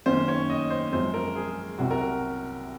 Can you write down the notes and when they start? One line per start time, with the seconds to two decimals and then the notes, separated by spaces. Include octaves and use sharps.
0.06 F#2 D#3 A#3 C#4 C5
0.28 C#5
0.50 D#5
0.70 C5
0.92 F#2 F3 G#3 C5
1.14 A#4
1.36 G#4
1.79 C2 C3 F#3 F#4
1.91 A#4